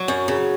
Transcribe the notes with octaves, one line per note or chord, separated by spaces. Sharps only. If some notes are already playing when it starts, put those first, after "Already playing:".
Already playing: F#3
F#2
C#3